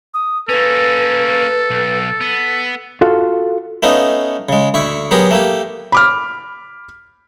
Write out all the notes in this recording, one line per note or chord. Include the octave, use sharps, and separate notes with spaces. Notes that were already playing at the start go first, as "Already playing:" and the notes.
D#6
A#3 C#4 A4 B4
B1
B3
F4 F#4 A4 F5
A3 B3 C#4 D#4 F4
C#3 G#3
D2 E4 C#6
F#3 B3 G4 G#4 A#4
A3 A#3 G4
B5 D6 F6